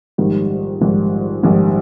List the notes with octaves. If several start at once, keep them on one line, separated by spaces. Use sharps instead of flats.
A#1 G#2 D#3 G3
A#1 G#2 D#3 G3
A#1 G#2 D#3 G3